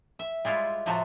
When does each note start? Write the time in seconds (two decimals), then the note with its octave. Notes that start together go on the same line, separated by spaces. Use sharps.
0.19 E5
0.45 G3 G#3 E4 F4
0.86 A2 C3 F3 F#4